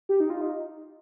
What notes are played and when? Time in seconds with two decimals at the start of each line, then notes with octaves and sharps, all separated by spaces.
0.09 G4
0.20 D#4
0.30 F4
0.41 D#4